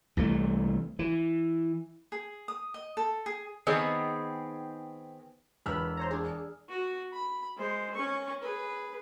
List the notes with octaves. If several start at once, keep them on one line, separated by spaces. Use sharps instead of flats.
C2 E3 A3
E3
G#4
D#6
D#5
A4
G#4
D#3 B3 C4 G#4
E1 B4 B5 E6 F6
C5 C#5 A#5
D4 G#4
F#4
B5
G#3 C5
C#4 C#6
G#4 B4